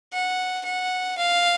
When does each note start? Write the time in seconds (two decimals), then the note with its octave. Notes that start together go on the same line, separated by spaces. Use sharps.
0.13 F#5
0.65 F#5
1.17 F5